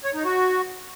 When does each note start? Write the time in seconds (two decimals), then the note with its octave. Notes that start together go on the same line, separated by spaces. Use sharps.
0.04 C#5
0.14 D#4
0.25 F#4